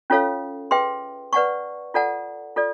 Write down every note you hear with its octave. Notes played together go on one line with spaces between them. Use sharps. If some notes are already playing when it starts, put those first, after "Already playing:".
C#4 F4 A4 C#5 F5
G#4 B4 E5 G5 C6
B4 D5 F#5 A5 C#6
F4 A4 D5 F#5 A5
F4 A4 D5